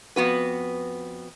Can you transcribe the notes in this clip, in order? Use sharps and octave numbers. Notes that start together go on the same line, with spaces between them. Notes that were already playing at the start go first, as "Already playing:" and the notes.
F2 B3 F#4 B4